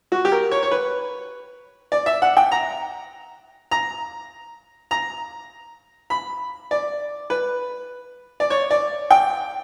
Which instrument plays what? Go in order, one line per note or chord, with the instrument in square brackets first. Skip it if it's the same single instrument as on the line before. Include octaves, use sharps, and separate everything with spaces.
[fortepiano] F#4
G4
A#4
C#5
C#5
B4
D5
E5
F#5
G5
A#5
A#5
A#5
B5
D5
B4
D5
C#5
D5
G5